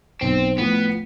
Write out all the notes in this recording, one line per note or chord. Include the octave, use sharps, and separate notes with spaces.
B1 C4
A2 F3 B3